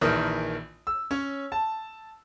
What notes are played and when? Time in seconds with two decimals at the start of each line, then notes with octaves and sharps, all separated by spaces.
0.01 A#1 D#3 E3 A#4 D#6
0.87 E6
1.11 C#4 C#5
1.52 A5